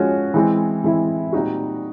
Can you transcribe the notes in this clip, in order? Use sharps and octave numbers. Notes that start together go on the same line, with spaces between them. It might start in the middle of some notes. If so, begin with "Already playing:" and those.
Already playing: F3 G#3 C#4 F#4
E3 G#3 C4 E4
E3 G#3 C4 E4
A#2 G3 C4 D#4 F#4